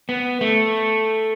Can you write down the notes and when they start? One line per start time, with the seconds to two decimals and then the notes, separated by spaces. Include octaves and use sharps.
0.09 B3
0.41 A3